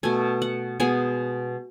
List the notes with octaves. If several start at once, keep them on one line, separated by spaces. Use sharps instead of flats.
B2 A3 G#5
F#5
B2 G#3 B3 G#5